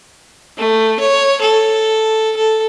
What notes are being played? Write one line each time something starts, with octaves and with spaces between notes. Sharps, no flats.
A3
C#5
A4
A4